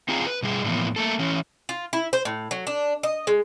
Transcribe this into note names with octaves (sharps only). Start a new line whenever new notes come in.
C4 F4 G#4 F5 A#5
B4
B2 G3 G#4
A2 D3 E3 F3 A#3 B3
A3 A#3 A4
E3 C#4
F4
E4
C5
A2
F#3
D4
D#5
G#3